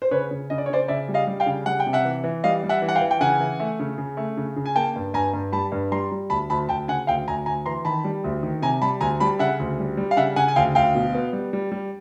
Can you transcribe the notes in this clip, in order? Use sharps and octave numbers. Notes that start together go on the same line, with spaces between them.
C5
C#3 B4 C#5
C#3
C#3 D#5
D5
C#5
C#3 C5 D5
C#3 D5 E5
G3
D#5 F5
G3
F5 G5
C#3
G3 F#5
G5
C3
E5 F#5
E3
E3
G3 D#5 F5
G3
E5 F#5
E3
F#5
F5 G5
E3
G5
C#3 F#5 G#5
E3
A3
C#3
C#3
A3
C#3
C#3
G#5
A#3 G5 A5
G2
G2 G#5 A#5
G2
G3 A5 B5
G2
G3 A#5 C6
G3
D2 A5 B5
D2 A5 B5
D2 G5 A5
C#3 F#5 G#5
D2 F5 G5
D2 G#5 A#5
D2 G#5 A#5
E3 A#5 C6
D#3 A5 B5
G3
D2
D#3
C3 G#5 A#5
G3 A5 B5
D2 G#5 A#5
G3 A5 B5
C#3 E5 F#5
D2
G3
G3
F5
C#3 E5 F#5
C#3 F#5 G#5
G#5
D2 F5 G5
D2 F5 G5
B2
B3
G3
G3
G3